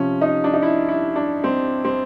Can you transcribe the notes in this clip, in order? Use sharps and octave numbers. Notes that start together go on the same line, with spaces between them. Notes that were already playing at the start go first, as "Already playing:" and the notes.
Already playing: C3 F3 C#4
D#4
D4
D#4
E4
E4
D4
C4
C4